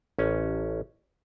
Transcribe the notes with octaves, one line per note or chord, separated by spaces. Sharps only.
A1 C#4